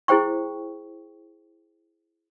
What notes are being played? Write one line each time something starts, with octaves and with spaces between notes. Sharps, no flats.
E4 G#4 C5 G5 C#6